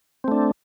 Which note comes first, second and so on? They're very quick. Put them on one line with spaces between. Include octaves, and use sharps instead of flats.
C4 A3 D4